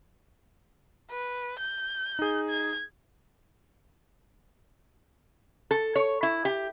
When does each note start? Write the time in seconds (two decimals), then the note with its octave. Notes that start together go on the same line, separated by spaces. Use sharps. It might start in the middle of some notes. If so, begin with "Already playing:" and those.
1.10 B4
1.59 G6
2.19 D#4 G#4
2.49 G#6
5.71 A4
5.96 C#5
6.23 E4
6.45 G4